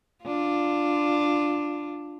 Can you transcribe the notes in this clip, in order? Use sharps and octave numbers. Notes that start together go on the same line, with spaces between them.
D4 F4